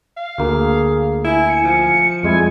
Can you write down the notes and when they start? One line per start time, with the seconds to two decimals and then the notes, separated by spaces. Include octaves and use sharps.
0.17 F5
0.38 D2 A#3 G#4
1.24 E4 G#5
1.48 C#7
1.64 F3
2.23 F2 G3 G#3 E4 G#5